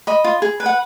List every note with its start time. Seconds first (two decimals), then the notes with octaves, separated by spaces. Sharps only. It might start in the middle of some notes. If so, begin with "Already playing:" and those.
0.07 D#5 B5
0.24 F4
0.42 G#4
0.60 B4
0.66 F#5